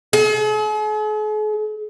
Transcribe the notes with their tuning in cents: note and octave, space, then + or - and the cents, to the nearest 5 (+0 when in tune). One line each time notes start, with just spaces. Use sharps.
G#4 +45